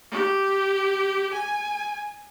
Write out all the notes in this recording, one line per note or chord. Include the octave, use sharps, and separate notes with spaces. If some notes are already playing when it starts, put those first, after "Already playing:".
G4
G#5